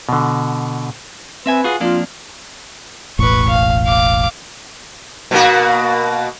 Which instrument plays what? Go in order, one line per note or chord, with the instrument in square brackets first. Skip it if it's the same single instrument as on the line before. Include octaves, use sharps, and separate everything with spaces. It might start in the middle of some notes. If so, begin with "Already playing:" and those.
[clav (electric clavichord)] B2 D3
[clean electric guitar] C4 E5 G#5 [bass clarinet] B4
[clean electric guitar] F4 F#4 G#4
[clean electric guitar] F2 A#3 D4 [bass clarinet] F4
[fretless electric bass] E1 A1 A2 [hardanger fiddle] B4 C#6
[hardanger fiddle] F5
F5 D6
[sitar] B2 A#3 F#4